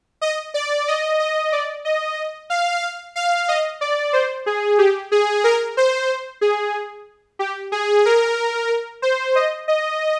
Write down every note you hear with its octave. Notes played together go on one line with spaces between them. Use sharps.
D#5
D5
D#5
D#5
D5
D#5
F5
F5
D#5
D5
C5
G#4
G4
G#4
A#4
C5
G#4
G4
G#4
A#4
C5
D#5
D#5